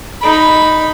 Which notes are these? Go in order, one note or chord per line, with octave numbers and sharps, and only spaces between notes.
D#4 B5